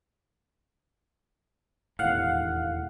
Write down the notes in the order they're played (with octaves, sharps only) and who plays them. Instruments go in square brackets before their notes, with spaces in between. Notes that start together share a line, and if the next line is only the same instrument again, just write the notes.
[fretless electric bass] E1 D#2 A2 [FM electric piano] F5 F#5